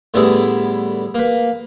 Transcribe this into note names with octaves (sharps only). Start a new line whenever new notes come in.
A2 D3 G3 B3 E4 G#4
A#3 B4